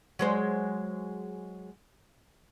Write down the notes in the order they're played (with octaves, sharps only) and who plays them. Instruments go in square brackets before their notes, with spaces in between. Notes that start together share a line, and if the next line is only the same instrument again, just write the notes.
[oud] F#3 G#3 C5